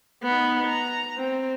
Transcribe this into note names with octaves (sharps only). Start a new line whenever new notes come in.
B3 D#4
A#5
C4